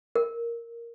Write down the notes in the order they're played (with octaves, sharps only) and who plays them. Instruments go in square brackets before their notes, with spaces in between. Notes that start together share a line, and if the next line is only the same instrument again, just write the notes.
[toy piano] A#4